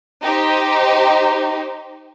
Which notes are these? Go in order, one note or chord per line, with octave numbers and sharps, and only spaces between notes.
D#4 G4 C5